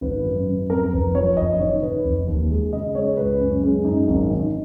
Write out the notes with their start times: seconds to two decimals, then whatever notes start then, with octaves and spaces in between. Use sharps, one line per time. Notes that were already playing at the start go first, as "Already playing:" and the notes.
0.01 G#1 B4
0.24 F#2
0.47 F#2
0.70 F2 A#4
0.92 F1 B4
1.15 F3 C#5
1.37 F#1 D#5
1.59 D#3 C#5
1.82 D#3 B4
2.04 F1
2.27 D#2
2.50 G#3
2.72 C#3 D#5
2.95 G#3 C#5
3.17 C#2 B4
3.40 F#2 C#4
3.63 G#3 C#4
3.85 F#2 D#4
4.07 G#1 C#4
4.30 D#3